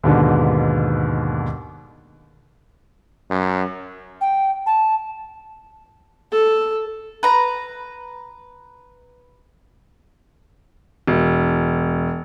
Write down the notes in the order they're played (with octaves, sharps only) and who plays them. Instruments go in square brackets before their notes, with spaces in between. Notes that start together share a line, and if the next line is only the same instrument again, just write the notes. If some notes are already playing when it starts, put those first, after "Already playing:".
[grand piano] D#2 G#2 B2 D3
[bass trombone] F#2
[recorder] G5
A5
[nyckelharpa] A4
[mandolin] B4 A#5
[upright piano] E1